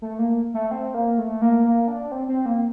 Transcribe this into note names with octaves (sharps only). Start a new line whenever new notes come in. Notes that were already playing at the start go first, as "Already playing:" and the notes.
A3
A#3
A3
C4
A#3
A3
A#3
A#3
D4
C4
C4
A#3